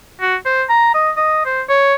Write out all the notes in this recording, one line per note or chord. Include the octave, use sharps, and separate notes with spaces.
F#4
C5
A#5
D#5
D#5
C5
C#5